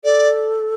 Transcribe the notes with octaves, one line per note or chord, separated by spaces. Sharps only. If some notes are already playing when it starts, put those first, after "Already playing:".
A4 D5